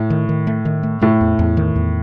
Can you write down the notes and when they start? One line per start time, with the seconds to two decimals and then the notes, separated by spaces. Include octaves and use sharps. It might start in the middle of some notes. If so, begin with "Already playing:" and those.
Already playing: A2
0.10 D#3
0.29 D#3
0.47 A3
0.65 D#3
0.83 A3
1.01 A2 A3
1.21 E2
1.39 E2
1.57 D#3
1.76 E2